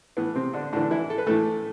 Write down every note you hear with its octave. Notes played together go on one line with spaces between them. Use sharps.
A2 E3 B3
C3 C4
D3 D4
A2 D3 E3 D4
E3 E4
A4
B4
A2 E3 A3 A4